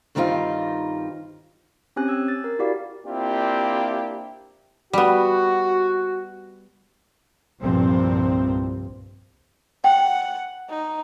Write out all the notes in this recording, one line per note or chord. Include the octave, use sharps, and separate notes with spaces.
G2 D#3 G3 C4 D#4 F4
C4 C#4 G4 G#5 F#6
E6 G#6
A6
A#4
E4 F#4 G4 D5 F5
A#3 C4 D4 E4 F4 G4
G3 B3 F#4
C2 G2 A#2 F3 C4
F#5 G5
D#4